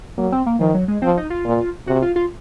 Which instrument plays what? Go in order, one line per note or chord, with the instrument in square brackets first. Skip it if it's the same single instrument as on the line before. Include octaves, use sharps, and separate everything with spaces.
[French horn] F#3 [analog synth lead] A#3
[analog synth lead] C4
A#3
[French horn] D#3 [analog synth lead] F3
[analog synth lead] F#3
G#3
[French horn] F3 [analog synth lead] C4
[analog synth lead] D#4
F4
[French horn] A#2
[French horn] C3 [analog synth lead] F#4
[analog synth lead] F4
F4